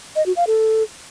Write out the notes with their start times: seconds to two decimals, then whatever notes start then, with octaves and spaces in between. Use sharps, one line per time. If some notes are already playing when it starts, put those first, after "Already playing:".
0.16 D#5
0.26 F#4
0.37 F5
0.47 A4